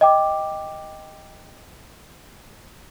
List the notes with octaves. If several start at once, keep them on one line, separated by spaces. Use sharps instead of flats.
D#5 G5 D6